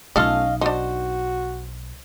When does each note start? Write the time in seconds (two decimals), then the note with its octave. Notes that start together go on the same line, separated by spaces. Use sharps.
0.16 B1 A3 C#4 F4 A4 D#5 F5
0.61 D4 D#4 F#4 C5